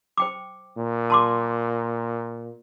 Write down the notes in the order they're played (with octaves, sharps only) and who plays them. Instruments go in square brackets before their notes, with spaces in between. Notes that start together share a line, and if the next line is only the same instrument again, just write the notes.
[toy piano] C5 G5 D6
[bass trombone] A#2
[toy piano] A5 C6 D6